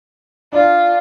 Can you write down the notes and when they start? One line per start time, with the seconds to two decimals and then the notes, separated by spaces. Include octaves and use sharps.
0.53 D4 F4